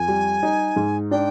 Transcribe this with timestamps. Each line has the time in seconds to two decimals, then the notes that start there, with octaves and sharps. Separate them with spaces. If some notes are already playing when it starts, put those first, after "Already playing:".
Already playing: F2 G#5
0.08 G3
0.43 D#4
0.76 G#2
1.11 D4 G5